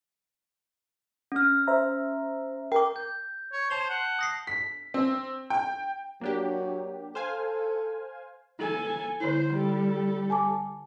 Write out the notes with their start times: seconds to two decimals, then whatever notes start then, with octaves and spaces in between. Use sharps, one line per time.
1.32 C#4 F6
1.67 C5 E5 A#5
2.72 A#4 G5 D6
2.96 G6
3.53 C#5
3.70 C5 A5 F7 G7
3.90 F#5
4.19 D#6 A#6 C7
4.47 B6
4.94 C4
5.50 G5
6.21 F#3 A#3 D4 G4
7.15 A4 C5 F5 G#5
8.59 A4 G#5
9.20 D3 E4 C5
9.54 G3 A4
10.30 G#5 A5 D6